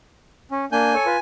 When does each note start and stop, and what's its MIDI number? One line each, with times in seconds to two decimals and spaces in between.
0.51 0.65 61
0.72 0.94 58
0.72 0.94 62
0.72 1.20 80
0.72 0.94 91
0.94 1.05 69
0.94 1.05 73
1.06 1.17 65
1.06 1.17 71